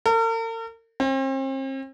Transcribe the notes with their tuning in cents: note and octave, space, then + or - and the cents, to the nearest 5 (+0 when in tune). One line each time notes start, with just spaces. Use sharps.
A#4 -45
C4 +40